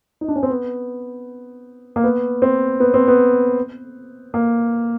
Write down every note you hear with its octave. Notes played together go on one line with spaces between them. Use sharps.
D#4
D4
C#4
C4
B3
A#3
B3
C4
B3
C4
B3
A#3